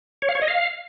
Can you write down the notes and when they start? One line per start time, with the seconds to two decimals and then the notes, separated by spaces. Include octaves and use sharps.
0.22 C#5
0.29 F5
0.35 C#5
0.42 D#5
0.48 F5